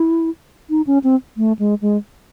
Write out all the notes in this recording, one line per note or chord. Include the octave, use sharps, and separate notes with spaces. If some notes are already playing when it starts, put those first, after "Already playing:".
Already playing: E4
D#4
C#4
C4
A3
G#3
G#3